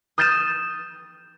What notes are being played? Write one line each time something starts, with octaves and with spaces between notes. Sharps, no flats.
D#6 F6 G6 A6 D#7 E7